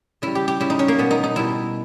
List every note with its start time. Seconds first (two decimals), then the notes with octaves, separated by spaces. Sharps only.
0.22 C#3 G3 E4
0.35 G4
0.48 G4
0.60 C#3 G3 E4
0.70 D#4
0.79 C#4
0.88 A#3
0.98 B2 G3 B3
1.11 D#4
1.24 D#4
1.36 B2 G3 E4